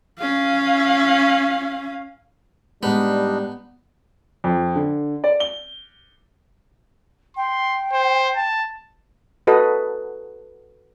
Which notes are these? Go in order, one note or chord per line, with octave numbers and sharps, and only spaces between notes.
C#4 F5
A2 G3 G#3 B3 D4 D#4
F2
D3
D5
G7
G5 C6
C5
A5
F#4 A4 B4 D#5